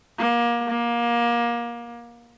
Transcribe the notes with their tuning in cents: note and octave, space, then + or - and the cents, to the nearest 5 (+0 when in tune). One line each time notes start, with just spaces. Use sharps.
A#3 +25
A#3 +25